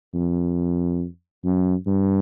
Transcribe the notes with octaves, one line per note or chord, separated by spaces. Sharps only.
F2
F#2
G2